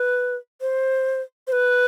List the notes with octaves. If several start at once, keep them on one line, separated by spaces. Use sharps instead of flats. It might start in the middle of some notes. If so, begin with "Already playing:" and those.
Already playing: B4
C5
C5
B4